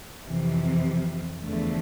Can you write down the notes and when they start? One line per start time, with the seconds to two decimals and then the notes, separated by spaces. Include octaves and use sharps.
0.27 F2 C3 E3
1.43 E2 D3 F3 A3